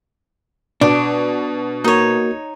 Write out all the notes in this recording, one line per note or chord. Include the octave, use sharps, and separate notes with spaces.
B2 D4
A#3 D#4 F#4 A#4 C#5